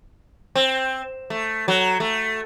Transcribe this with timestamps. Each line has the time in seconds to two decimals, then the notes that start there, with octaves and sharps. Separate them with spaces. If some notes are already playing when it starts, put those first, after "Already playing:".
0.55 C4
1.30 A3
1.68 F#3
2.00 A3